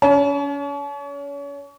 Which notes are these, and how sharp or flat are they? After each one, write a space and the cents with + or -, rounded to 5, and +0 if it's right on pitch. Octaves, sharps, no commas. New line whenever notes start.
C#4 +35 A5 -45